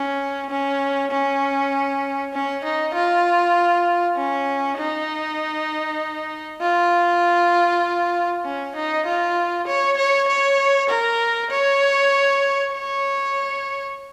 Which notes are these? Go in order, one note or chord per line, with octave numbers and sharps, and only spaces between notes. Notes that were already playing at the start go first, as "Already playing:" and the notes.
Already playing: C#4
C#4
C#4
C#4
D#4
F4
C#4
D#4
F4
C#4
D#4
F4
C#5
C#5
C#5
A#4
C#5
C#5